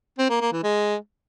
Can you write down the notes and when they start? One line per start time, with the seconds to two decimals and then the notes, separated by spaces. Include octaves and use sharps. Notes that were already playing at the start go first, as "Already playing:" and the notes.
0.18 C4
0.30 A#3
0.41 A#3
0.52 E3
0.64 G#3